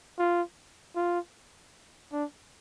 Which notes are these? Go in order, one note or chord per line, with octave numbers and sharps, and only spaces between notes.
F4
F4
D4